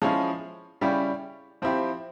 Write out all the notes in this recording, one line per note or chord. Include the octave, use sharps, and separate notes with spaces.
F3 G#3 C#4 E4 G#4
C#3 G3 C#4 E4 G4
F3 C4 E4 G4